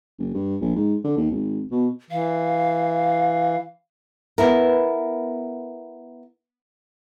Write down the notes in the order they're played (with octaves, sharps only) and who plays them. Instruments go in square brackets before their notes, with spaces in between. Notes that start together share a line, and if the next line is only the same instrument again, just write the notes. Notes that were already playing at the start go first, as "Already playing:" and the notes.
[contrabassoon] F#1
G2
A#1
G#2
D3
D#2
G#1
B2
[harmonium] E3 [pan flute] F5
[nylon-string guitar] B3 E4 A#4